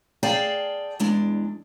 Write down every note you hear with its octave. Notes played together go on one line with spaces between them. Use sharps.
G#4 D5 F5 G5 A5
E2 G#3 D4